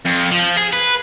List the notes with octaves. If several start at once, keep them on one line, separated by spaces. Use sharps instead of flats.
F2
F3
G#4
B4